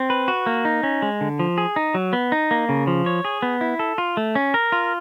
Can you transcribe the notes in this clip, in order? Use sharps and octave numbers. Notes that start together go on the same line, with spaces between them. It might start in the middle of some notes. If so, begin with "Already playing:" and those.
Already playing: C4
B4
F#4
A#3
D#4
C#4
G#3
D3
F3
G#4
D#4
F#3
B3
D#4
A#3
C#3
F3
C#5
G#4
B3
E4
A4
F4
A3
C#4
A#4
F4